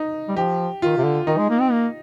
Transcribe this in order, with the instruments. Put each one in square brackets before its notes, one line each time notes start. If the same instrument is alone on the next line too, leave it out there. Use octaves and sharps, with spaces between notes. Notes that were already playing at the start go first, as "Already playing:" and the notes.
Already playing: [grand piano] D#4
[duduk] G3
[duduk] F3 [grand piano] G4
[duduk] D#3 [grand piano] F4
[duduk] C3
D3
[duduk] D#3 [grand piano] D#4
[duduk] G#3
A#3
C4
A#3